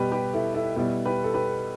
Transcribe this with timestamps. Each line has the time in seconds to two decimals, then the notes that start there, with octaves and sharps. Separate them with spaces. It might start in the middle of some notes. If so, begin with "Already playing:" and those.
Already playing: B2 G3 G4 B4
0.11 G4 B4
0.33 E4 A4
0.54 E4 A4
0.76 B2 G3 B3 E4
1.05 G4 B4
1.24 A4
1.34 G4 B4